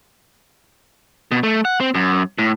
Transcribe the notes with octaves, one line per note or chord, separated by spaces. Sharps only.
B2
A3
F#5
C4
F#2
A2